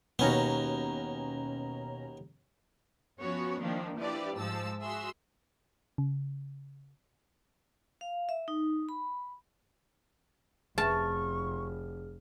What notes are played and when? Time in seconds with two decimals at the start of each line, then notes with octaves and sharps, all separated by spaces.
0.19 D#2 B2 B3 C#4 A#5
3.19 F3 B3 C#4 F#4 C#5
3.61 D#3 F3 A#3 C4 D4
3.97 F3 D4 E4 G4 B4 D5
4.36 G#2 F3 G#3 A5 E6
4.82 F#4 G#4 E5 C6 E6
5.98 C#3
8.01 F5
8.29 E5
8.48 D#4
8.89 B5
10.78 F1 G#4 A5 C#6 F6